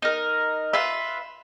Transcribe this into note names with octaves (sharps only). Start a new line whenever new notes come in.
D#4 A#4
F4 B4 E5